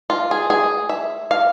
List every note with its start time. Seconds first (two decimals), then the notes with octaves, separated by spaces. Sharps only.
0.10 F4
0.31 G#4
0.50 G#4
0.89 E5
1.31 F5